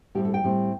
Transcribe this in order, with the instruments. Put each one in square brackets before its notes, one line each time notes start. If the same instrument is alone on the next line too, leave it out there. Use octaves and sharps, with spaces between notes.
[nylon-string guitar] A2 G3 C4 G4
A4
G5
A2 G3 C4